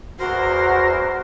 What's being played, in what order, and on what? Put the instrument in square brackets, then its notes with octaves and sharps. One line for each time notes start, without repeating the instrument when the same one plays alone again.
[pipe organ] E2 A#4 A#6 [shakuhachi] F#4 [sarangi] C5